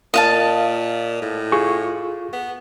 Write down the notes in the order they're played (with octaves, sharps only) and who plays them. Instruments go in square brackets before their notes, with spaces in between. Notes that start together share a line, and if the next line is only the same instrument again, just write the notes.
[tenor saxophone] A#2 [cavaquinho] D#5 F5 A5
[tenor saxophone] A2
[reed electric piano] F4 G#4 C#6
[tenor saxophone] B3